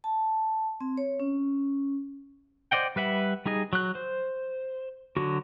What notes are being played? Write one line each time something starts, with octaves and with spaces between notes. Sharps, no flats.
A5
C4
C#5
C#4
C5 D5 D#5 F#5 G5
G3 B4 E5 F#5
G3 D#4 G#4 D#5
F#3 F#6
C5
D3 F#3 F#4